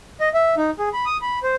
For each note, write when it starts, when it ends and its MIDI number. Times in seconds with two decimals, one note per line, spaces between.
0.20 0.29 75
0.34 0.55 76
0.57 0.70 63
0.79 0.89 68
0.93 1.05 83
1.06 1.17 87
1.22 1.39 83
1.43 1.55 72